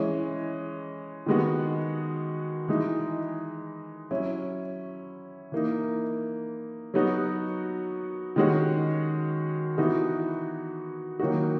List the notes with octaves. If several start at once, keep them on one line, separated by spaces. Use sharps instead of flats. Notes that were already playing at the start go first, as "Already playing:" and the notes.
Already playing: E3 G#3 C#4
D#3 G#3 B3 F#4
E3 G#3 D#4
F#3 C#4 E4
E3 A#3 D#4
F#3 B3 D#4 F#4
D#3 G#3 C#4 F#4
E3 B3 D#4 F#4
D#3 F#3 A#3 D#4 F#4